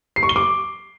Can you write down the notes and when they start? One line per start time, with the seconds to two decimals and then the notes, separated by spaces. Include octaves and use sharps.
0.16 C7
0.23 C#6
0.29 G7
0.36 D6